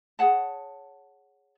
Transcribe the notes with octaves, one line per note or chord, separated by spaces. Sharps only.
G#4 C#5 F#5 A5